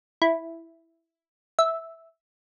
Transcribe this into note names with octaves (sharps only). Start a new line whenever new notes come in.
E4
E5